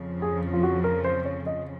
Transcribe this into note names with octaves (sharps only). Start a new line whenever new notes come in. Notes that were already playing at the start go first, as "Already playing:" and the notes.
Already playing: F2 C#3 F3
G#4
F4
F#4
A#4
C5
C#5
D#5